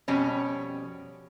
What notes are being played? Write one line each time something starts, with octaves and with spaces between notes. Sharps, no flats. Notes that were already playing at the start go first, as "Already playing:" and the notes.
F2 B2 G3 C#4